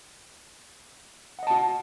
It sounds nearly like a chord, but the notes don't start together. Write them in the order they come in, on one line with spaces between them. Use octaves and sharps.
F#5 D#5 A5 F#4